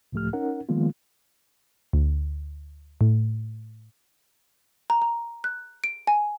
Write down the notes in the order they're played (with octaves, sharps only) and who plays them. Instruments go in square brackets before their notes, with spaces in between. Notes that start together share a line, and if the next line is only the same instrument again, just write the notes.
[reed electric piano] C#2 A2 F3 A3 G4 F6
C#4 D#4 A#4 F#5
D#3 F3 G#3 A#3 B3 F4
[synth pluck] D2
A2
[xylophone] A#5
A#5
F#6
D7
G#5